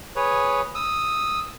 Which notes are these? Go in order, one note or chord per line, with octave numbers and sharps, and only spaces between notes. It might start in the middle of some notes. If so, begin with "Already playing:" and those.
G#4 B4 C#5
D#6 E6